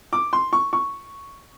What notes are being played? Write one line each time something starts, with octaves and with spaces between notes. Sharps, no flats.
D6
C6
C#6
C#6